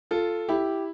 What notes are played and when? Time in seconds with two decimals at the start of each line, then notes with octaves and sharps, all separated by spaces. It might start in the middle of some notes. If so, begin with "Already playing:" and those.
0.11 F4 A4
0.49 E4 G4